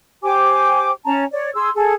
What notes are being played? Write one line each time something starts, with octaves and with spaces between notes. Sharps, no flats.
G4 C5 G#5 D6
C#4 A5 A#5
C#5 D5
G#4 C6 E6
G#4 A4